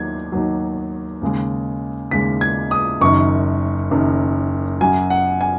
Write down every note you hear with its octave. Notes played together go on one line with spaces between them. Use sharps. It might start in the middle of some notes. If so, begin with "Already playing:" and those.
Already playing: D#2 D#3 F#3 G#6
D#2 D#3 F#3
D#2 C#3 G#3
D#2 C#3 G#3 B6
G#6
D#6
F#1 F#2 D#3 C#6
F#1 F#2 D#3
F#2 F#3 G#5
F#5
G#5